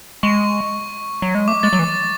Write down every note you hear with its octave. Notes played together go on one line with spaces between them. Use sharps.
G#3 C#6
F#3
G#3
A3 D6
G#3 A6
F#3
E3